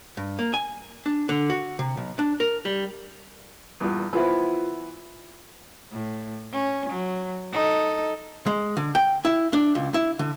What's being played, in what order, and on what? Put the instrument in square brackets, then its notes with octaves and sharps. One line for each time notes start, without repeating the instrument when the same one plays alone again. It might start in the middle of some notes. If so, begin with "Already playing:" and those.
[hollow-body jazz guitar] G2
A#3
G#5
D4
D3
F#4
C3
B1
D4
A#4
G3
[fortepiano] E2 G2 A#2
[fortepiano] E3 B3 E4 [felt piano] F4 C5
[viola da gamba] A2
C#4
F#3
D#4 A4
[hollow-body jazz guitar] G#3
D3
G5
E4
D4
C#2
E4
D3